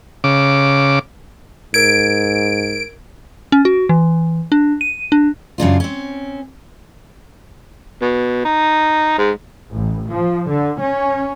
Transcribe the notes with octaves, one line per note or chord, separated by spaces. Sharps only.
C#3 D6
G#2 A#4 G#6 D7
C#4
F#4
E3
D4
D#7
D4
F#2 C#3 D4 F4
C4 C#4
B2
D#4
G#2
A1
F3
D3
C#4